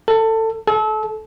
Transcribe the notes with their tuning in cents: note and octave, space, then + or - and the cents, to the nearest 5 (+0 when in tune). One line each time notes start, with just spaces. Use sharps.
A4 +20
A4 -30